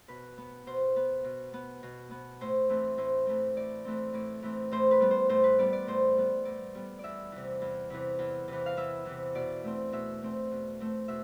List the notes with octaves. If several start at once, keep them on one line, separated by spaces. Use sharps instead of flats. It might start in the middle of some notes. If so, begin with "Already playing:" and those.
B2 B4
B3
B2 C5
B3
B2
B3
B2
B3
A2 C5
E3 A3 C4
A2 C5
E3 A3 C4
A2 D5
E3 A3 C4
A2 D5
E3 A3 C4
A2 C5
B4
G3 B3
C5
A2 C5
B4
G3 B3 D5
D5
A2 C5
G3 B3
A2 D5
G3 B3
E2 D5 E5
C3 E3
E2
C3 E3
E2
C3
E3
F5
E2 E5
C3 E3
B2 D5
A3 C4
B2 E5
A3 C4
B2
A3 C4
B2 E5